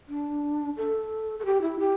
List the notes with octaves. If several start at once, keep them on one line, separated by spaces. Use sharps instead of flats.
D4
A4
A4
G4
E4
G4